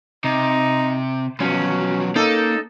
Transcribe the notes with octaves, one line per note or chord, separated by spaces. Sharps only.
C3 D#4
B2 F3 F#3 C#4
A#3 D#4 A4